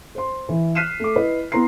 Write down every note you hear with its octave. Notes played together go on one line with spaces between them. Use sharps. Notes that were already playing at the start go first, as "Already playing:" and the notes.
C5 C6
E3
F6 F#6 B6 C7 D#7 E7
A3 D6
E4 B4 D#5
B3 E4 A#5 C6 C7